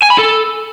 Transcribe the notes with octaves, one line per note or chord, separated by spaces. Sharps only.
G#5
B5
A4